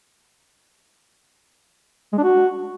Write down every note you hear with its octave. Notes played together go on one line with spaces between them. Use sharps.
G#3
D4
F#4